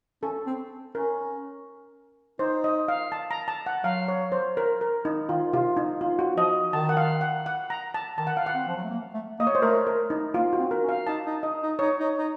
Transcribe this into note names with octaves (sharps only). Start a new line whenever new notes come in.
C#4 A4
C4
C#4 A#4
D#4 C5
D#5
F5
A5
A#5
A5
F#5
F#3 F5
C#5
C5
A#4
A#4
D#4
D#3 F4
C3 F4
D#4
F4
F#4
F3 D#5
D#3 A5
F#5
F5
F#5
F#5
A#5
A5
D#3 A5
F#5
F5
F#5
C4
F3
F#3
A3
A#3
A3
A#3 D#5
C#5
C5
A3 A#4
A#4
D#4
A#3 F4
F#4
C4
A#4
C#4
F5
D#4 A5
D#4
D#4 D#5
D#4
D#4 C#5
D#4
D#4